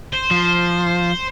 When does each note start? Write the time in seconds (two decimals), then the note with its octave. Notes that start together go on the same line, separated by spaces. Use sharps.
0.13 C5
0.31 F3